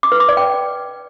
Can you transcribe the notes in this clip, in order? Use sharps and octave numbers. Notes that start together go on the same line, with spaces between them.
D6
B4
D6
D5
G5